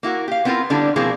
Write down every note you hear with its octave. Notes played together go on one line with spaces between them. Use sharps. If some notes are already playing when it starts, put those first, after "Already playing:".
A#3 E4 F#4 A#4
G4 F5
B3 C4 E4 F4 A#4
D3 G3 B3 D4 E4
B2 F3 A#3 C4 E4 G#4